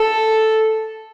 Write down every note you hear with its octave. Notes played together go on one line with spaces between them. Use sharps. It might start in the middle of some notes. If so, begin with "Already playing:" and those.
Already playing: A4